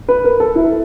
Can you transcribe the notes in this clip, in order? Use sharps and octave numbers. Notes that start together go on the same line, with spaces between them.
B4
A#4
A4
E4